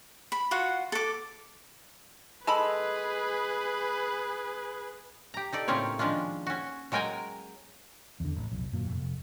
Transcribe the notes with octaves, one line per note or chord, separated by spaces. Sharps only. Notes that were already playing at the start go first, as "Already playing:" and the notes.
B5
F4 F#4 F#5
A4 D6
G#3 G#4 A4 B4 B5
G4 A#5
D#4 A4 D5
A2 C#3 A#3 C4 F4 C#5
D#3 F3 G#3 C#4 D4 F4
C#4 F#4
F#3 G#3 A#4 G5 G#5 A#5
E2 D3
A1
F1 B1
G1 F#2 A#2 F#3
F1